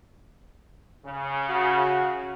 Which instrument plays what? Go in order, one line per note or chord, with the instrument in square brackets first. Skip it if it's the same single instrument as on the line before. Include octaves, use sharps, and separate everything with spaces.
[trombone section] C#3
[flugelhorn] F#4